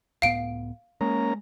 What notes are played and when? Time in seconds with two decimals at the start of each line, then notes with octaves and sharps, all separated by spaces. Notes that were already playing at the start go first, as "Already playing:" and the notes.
0.22 C#2 A2 B3 F5 D7
1.01 G#3 A#3 C#4 A#5